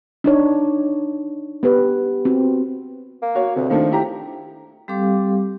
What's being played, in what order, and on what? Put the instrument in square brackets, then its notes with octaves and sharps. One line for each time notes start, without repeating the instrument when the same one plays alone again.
[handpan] D4 D#4 C#5
B3 G4 B4
C4 F#4
[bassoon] A#3
[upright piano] F#4 C#5
[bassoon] D2 [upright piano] C3
[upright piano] D#3 A3 D4 [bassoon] F3
[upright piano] E4 G4 A#5
[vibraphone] G3 C4 G4 A4 F5 D6